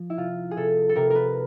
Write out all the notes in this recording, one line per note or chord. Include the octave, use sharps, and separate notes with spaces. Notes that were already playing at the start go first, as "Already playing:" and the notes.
Already playing: F3
E4
C3 F4
G#4
C3 A4
A4
C3 A#4
A#4 B4